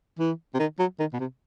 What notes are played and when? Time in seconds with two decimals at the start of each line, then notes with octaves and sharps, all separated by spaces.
0.19 E3
0.54 C3
0.60 D#3
0.79 F#3
0.99 D#3
1.13 B2
1.20 C3